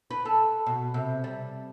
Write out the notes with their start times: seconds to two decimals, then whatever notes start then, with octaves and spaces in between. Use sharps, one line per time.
0.11 B4
0.25 A4
0.66 B2
0.94 C3
1.24 G3